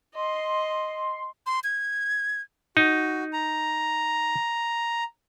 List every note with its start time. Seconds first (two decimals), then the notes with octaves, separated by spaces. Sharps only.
0.15 D#5 C6
1.46 C6
1.64 G#6
2.77 D#4 F#4
3.33 A#5